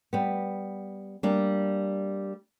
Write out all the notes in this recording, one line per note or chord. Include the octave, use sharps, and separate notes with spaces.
G3 B3
G3 A#3 D4